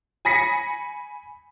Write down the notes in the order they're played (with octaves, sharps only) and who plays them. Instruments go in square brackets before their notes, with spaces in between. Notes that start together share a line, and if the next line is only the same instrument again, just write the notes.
[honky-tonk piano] G#5 B5 A#6 B6 C#7